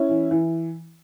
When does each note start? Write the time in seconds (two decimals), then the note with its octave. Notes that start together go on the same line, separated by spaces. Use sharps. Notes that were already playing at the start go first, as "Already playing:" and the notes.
Already playing: C#4 E4
0.09 E3
0.31 E3